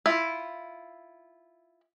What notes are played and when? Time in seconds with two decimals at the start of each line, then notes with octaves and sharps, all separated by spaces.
0.06 E4 F4